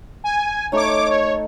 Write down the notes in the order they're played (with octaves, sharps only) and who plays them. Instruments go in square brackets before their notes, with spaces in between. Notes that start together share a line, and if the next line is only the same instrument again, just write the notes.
[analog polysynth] G#5
[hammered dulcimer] A3 D#4 A4 [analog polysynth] C#5 D6
[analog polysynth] C#5